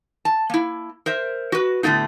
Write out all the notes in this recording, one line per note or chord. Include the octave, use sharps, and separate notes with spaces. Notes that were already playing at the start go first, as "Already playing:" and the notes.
A5
A#3 E4
A#4 C5 E5
F#4 B4
A2 D3 A3 B3 D#4